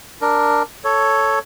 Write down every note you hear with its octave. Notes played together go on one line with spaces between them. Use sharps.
D4 A#4
A4 C#5